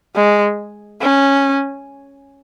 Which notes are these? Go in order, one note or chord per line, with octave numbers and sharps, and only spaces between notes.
G#3
C#4